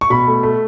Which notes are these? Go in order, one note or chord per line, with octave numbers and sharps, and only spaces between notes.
C#6
B2 B5
A3
A3